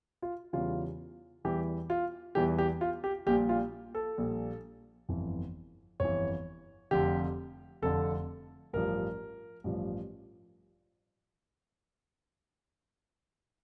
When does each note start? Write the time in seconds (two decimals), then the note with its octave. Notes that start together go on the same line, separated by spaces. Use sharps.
0.22 F4
0.53 E2 C#3 E3 G3 F4
1.44 E2 E3 G3 G4
1.90 F4
2.35 E2 E3 G3 G4
2.58 G4
2.81 F4
3.04 G4
3.26 A#1 A#2 G3 G4
3.49 F4
3.95 A4
4.18 A#1 A#2 G3
5.09 G1 F2 E3
6.00 G1 F2 E3 C#5
6.91 F1 F2 D3 G4
7.82 F1 F2 D3 A4
8.73 A1 G2 F3 A#4
9.64 A1 G2 F3